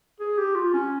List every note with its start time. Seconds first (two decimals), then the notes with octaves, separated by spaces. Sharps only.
0.20 G#4
0.38 G4
0.55 F4
0.74 C#4